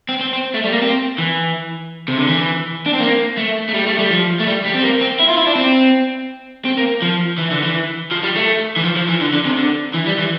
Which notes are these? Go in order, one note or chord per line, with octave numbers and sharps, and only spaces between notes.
C4
C4
C4
A3
G3
A#3
C4
E3
C3
D3
E3
D4
C4
A#3
A3
A3
G3
A3
G3
F3
A3
G3
G3
C4
A#3
C4
E4
F4
E4
D4
C4
C4
A#3
F3
E3
D3
E3
F3
G3
A3
E3
F3
F3
E3
D3
D3
C3
D3
E3
G3
E3